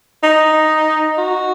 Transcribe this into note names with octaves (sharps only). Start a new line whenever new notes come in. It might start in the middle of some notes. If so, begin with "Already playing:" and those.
D#4
F#4